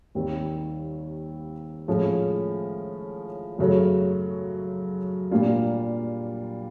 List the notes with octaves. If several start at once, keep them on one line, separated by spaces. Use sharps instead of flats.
D#2 D#3 G3 C4
A2 F3 G#3 C#4
F#2 C#3 F#3 A3
A#2 G3 A#3 D4 F4